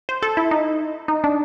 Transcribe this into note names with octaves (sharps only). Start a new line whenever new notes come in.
C5
A4
E4
D#4
D#4
D4